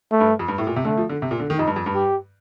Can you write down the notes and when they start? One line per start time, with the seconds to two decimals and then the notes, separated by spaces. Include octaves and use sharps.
0.12 A3
0.20 G2
0.39 F2
0.48 G2
0.58 A2
0.67 A#2
0.76 C3
0.85 D3 A3
0.97 F3
1.09 D3
1.22 C3
1.31 A#2
1.40 D3
1.50 D#3
1.58 F2 D#4
1.67 G2
1.76 F2
1.86 G2
1.95 G4